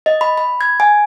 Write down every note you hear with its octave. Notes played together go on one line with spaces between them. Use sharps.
D#5
B5
B5
G#6
G#5